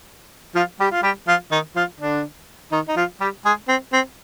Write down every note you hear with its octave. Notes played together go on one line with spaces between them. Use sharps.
F3 F4
G3 G4
F4
G3 G4
F3 F4
D#3 D#4
F3 F4
D3 D4
D#3 D#4
D#4
F3 F4
G3 G4
G#3 G#4
C4
C4